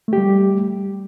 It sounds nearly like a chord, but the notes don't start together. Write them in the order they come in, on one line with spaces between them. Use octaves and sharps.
A3 G4 G3